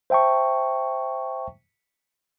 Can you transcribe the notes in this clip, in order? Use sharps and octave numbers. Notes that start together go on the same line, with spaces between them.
C5 E5 G5 A5 C#6